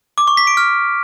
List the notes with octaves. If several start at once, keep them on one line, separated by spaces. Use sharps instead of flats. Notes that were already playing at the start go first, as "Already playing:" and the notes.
D6
C#6
B6
D7
F6